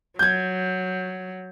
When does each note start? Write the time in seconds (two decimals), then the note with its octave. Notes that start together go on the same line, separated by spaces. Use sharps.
0.19 F#3 G6 G#6